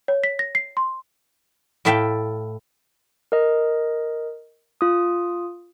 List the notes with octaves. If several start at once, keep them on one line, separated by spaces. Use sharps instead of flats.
C#5
B6
A#6
C7
C6
A2 E4 A4 E5 F5 G5
A#4 D#5
F4 D#6